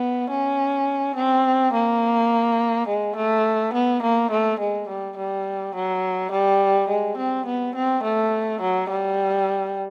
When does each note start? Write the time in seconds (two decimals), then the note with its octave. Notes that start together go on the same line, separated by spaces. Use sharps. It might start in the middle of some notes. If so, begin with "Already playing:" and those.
Already playing: B3
0.30 C#4
1.16 C4
1.73 A#3
2.88 G#3
3.16 A3
3.74 B3
4.03 A#3
4.31 A3
4.60 G#3
4.88 G3
5.17 G3
5.75 F#3
6.32 G3
6.89 G#3
7.17 C4
7.46 B3
7.75 C4
8.03 A3
8.61 F#3
8.90 G3